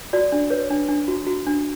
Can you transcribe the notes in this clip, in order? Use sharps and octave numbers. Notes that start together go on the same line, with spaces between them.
F#4 D5
D4
B4 C#5
D4
D4
F#4
F#4
D4